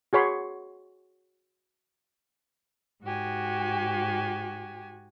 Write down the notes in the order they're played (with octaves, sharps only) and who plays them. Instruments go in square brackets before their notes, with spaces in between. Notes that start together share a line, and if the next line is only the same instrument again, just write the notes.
[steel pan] F#4 G#4 C#5 B5 C6
[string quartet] G#2 F#4 G4 G#5